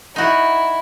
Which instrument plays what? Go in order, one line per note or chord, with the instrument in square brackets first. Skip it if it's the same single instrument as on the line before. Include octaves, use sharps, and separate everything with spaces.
[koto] D#4 F#4 [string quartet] E4